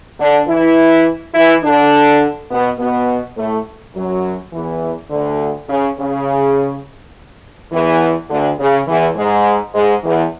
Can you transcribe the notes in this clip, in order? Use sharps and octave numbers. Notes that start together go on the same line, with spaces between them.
D3 D4
E3 E4
E3 E4
D3 D4
B2 B3
B2 B3
A2 A3
F#2 F#3
E2 E3
D2 D3
C#3
C#3
E2 E3
D2 D3
C#3
E2 E3
G#2 G#3
G#2 G#3
E2 E3